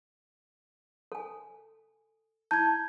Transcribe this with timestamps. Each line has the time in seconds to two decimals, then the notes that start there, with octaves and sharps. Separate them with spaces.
1.12 A4 G#5
2.51 E4 A5 G6 G#6